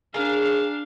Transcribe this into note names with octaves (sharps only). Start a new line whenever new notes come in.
D4 G#4 A#4 F5